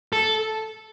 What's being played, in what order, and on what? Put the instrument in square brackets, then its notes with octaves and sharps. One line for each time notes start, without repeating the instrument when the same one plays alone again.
[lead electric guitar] A4